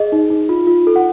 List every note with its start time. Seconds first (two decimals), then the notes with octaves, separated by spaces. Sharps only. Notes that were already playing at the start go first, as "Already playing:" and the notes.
Already playing: G#4 D#5
0.12 D#4
0.30 D#4
0.49 F4
0.67 F4
0.87 A4
0.96 F#5